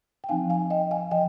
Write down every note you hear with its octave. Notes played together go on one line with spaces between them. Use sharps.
G5
F3 C4 D#4 F5 G#5
F5 G#5
D#5 G5
F5 G#5
F3 D#5 G5